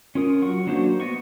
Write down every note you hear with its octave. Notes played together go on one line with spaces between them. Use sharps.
C#4 F4 A#4 D#6
F#3 F#5 C#6
F#3 A#3 D4 F#4 C5
B3 D#5 F#5 C#6